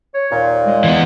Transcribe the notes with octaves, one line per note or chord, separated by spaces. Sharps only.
C#5
D#2 A#2
G#3
E3 B3